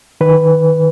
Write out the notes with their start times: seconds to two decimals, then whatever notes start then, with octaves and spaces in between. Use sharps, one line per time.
0.21 D#3 B4